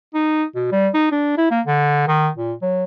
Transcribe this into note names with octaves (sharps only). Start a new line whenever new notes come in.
D#4
B2
G3
D#4
D4
E4
A#3
D3
D#3
A#2
F#3